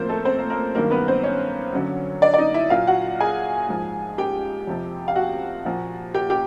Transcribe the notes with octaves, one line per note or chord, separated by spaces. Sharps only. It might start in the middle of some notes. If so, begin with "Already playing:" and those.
Already playing: A2 F3 A#3 C4 A#4 C5
A3 A4
C4 C5
A#3 A#4
A#3 A#4
G2 D#3 F#3 A#3 A#4
B3 B4
C4 C5
C#4 C#5
F#2 D3 F#3
D4 D5
D5
D#4 D#5
E4 E5
A#2 F#3 F4 F5
F#4 F#5
G#4 G#5
G#2 F3
G4 G5
F2 C3 F3
F5
F#4 F#5
A#2 F3
G4 G5
G4 G5